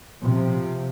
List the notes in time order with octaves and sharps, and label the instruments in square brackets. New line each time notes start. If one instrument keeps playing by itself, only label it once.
[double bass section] C3 F3